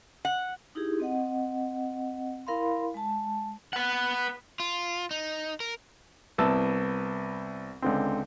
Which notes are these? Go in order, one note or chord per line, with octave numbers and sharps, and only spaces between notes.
F#5
D#4 E4 G4 G#4
C4 D#5 F#5
E4 A#4 F5 B5 C6
G#3 A5
B4 F#5
F4
D#4
A#4
C2 B3 E4 A5 E6
C#2 D3 C4